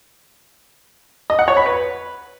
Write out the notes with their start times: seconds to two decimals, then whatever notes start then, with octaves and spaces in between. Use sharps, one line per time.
1.30 D#5
1.39 F#5
1.48 C#5
1.57 B5
1.66 B4